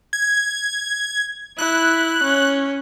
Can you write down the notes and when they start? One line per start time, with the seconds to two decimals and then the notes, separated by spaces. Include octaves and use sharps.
0.13 G#6
1.58 E4 F#6
2.24 C#4